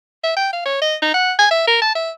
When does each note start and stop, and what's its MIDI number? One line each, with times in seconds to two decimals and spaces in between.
0.23 0.33 76
0.36 0.50 79
0.53 0.65 77
0.65 0.81 73
0.81 0.95 75
1.02 1.13 63
1.14 1.33 78
1.38 1.48 80
1.51 1.66 76
1.67 1.78 70
1.81 1.93 81
1.95 2.11 76